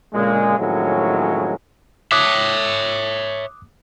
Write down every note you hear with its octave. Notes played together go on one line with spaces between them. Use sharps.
D2 A#2 C#3 G#3
F2 A2 D#3 F#3 G#3 C#4
C#5 E5 D6 D#6 F#6